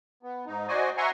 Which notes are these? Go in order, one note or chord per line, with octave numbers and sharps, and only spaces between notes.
B3
G#2 D#4
F#4 C5 D5 D#5 G#5
E5 F#5 G#5 A#5 C6 C#6